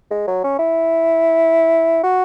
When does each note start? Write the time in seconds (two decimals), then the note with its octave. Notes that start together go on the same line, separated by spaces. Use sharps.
0.11 G#3
0.28 F#3
0.44 C#4
0.59 E4
2.03 F#4